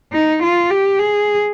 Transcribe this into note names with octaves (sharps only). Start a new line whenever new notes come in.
D#4
F4
G4
G#4